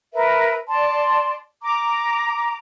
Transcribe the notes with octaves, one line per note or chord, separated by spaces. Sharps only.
A#4 B4 E5
D5 A5 C6
A#5 D6